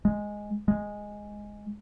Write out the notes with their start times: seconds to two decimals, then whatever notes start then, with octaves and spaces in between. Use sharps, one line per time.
0.05 G#3
0.68 G#3